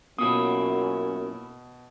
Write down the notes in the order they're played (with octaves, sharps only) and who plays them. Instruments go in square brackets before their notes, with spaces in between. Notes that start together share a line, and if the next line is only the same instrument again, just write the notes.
[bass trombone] F#2 [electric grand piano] B2 D#6 [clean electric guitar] A#3 C#4 E4 [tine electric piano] B3 F4